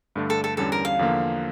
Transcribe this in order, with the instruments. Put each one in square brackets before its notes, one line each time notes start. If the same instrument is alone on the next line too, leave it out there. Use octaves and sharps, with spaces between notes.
[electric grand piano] G2 D3 A3 D4
[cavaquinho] A4
A4
[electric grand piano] E2 D3 G3 C#4 [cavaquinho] A4
[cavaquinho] A#4
F5
[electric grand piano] E2 D3 F3 A#3